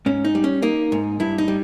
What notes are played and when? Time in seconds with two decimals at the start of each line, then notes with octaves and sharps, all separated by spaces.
0.06 G#2 C#4
0.25 D#4
0.35 G3
0.44 C#4
0.62 A#3 D#4
0.92 G#2
1.20 G2 E4
1.38 D#4
1.48 G3